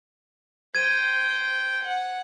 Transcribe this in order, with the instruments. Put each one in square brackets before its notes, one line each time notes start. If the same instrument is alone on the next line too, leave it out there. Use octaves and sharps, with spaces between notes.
[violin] C5 G5 [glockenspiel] G#6 D#7
[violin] F#5